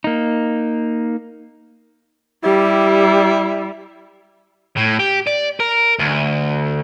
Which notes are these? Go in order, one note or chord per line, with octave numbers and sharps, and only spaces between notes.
A#3 D#4
G3 E4 G4
A2
G4
D5
A#4
D2